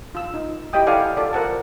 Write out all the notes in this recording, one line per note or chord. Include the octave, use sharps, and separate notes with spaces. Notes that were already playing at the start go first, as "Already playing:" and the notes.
F4 E6
D#4
E4 G4 D#5 E5 G5 D#6
E4 A4 D5 F5 F#5 G#5
F4 A4 D5
A#4 C5 F#5 A5